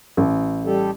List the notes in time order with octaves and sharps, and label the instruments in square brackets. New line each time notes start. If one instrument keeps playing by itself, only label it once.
[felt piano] A1
[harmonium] G3 G4 A4